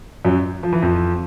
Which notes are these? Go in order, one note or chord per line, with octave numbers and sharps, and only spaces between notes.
F#2 F#3
F3
E3
F2 F3